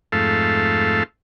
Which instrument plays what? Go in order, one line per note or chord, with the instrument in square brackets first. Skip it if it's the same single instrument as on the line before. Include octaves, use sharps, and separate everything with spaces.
[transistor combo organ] F2 G#2 A3 A4 F5